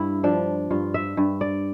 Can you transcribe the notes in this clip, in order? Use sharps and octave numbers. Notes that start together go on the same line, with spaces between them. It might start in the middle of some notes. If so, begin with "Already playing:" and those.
Already playing: G2 E4
F3 D4
G2 F4
E5
G2
D5